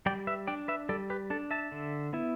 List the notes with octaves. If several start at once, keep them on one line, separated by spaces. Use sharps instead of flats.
G3 D5 G5
B4 E5
D4 D5 G5
B4 E5
G3 A4 D5
G4 B4
D4 A4
E5 A5
D3
B3 E4